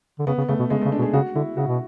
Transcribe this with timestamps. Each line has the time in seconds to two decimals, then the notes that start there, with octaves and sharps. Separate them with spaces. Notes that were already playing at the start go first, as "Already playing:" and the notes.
0.19 D3
0.27 C#3 B3
0.38 C#3
0.48 C#3 A3
0.59 B2
0.70 C#3 G#3
0.81 A3
0.85 C#3
0.92 D4
0.99 B2
1.02 G#4
1.13 C#3 F#4
1.35 D3 E4
1.57 C#3 F#4
1.67 B2